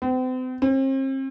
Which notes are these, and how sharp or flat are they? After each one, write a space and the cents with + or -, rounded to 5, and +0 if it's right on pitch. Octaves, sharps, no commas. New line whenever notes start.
C4 -40
C4 +40